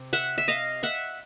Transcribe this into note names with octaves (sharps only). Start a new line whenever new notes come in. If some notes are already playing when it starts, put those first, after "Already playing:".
Already playing: C3
E5 F#5
E5
D#5 F5
E5 F#5